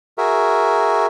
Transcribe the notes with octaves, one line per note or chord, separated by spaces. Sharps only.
F#4 G#4 A#4 E5